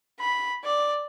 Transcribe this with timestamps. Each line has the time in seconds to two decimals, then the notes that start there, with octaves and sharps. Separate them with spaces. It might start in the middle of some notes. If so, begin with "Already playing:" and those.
0.20 B5
0.64 D5